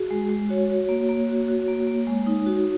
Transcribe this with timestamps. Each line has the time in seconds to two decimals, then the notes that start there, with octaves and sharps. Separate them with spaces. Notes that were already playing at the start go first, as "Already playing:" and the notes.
Already playing: F#4 G#4
0.11 G#3
0.30 G#3
0.49 F#4 C#5
0.69 F#4
0.89 A#3
1.09 A#3
1.29 F#4
1.48 F#4
1.68 A#3
1.87 A#3
2.07 G#3
2.26 D#4
2.46 F#4